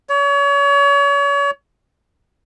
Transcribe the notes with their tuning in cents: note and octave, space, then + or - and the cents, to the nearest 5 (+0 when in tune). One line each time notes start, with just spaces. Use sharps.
C#5 +35